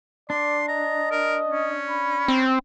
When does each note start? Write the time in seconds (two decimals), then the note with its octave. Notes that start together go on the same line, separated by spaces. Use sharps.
0.30 D4 D5 C6
0.69 D#5 A#5
1.11 A#4
1.48 C#4
1.90 B5
2.28 C4